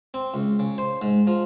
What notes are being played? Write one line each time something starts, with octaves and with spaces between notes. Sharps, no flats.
C4
C#2
C#3
C5
G#2
F3